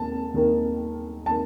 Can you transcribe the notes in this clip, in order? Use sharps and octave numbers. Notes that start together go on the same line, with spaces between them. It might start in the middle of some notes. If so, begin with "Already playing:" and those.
Already playing: D#2 A#3 A5
D#2 D#3 A#3 D#4
D#3 A#3 A5